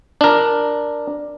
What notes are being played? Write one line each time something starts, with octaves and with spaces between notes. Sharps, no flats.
D4 A#4